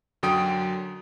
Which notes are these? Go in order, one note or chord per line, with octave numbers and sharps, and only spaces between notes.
F#2 D3 F#3 G5 D#6 D7